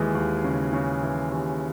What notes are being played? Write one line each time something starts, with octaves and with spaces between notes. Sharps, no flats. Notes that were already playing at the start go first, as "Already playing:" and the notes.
Already playing: D#2 E3 G#3
D#2
C#3
C#3
E3
D#2